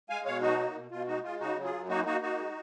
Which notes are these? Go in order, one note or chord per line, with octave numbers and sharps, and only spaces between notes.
G#3 F5 G#5
B2 C#5 F5
F#3 D#4 F#4
A#3
B2
B2 F4
G#3 D#4 F#4
G#3 F4
C#3 D#4 F#4
F#3
F4 G#4
F#2
A#3 D#4 F#4
A#3 D#4 F#4
A#3 D#4 F#4
G#3